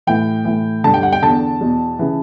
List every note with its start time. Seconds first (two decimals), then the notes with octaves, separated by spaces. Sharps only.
0.07 A2 E3 G5
0.45 A2 E3
0.84 G2 D3 A5
0.94 G5
1.03 F#5
1.13 G5
1.22 E2 D3 A5
1.61 E2 B2
1.99 C#3 E3